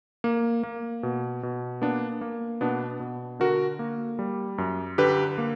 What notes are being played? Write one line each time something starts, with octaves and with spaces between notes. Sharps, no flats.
A#3
A#3
B2
B2
A#3 B3 D4
A#3
B2 B3 D4
B2
D3 F#4 A#4
A#3
G3
F#2
D3 G4 B4
A#3